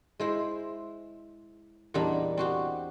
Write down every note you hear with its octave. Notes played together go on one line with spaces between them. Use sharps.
G#3 E4 C5
E2 A#2 G3 D4 D#4 B5
C4 F#4 G4